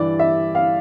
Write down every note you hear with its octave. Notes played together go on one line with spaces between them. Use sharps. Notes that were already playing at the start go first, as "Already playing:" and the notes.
Already playing: G2 E3 G3 D5
E5
F5